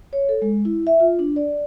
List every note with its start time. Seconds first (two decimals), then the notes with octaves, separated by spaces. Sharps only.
0.13 C#5
0.29 A4
0.42 G#3
0.65 E4
0.87 E5
1.00 F4
1.19 D4
1.36 D5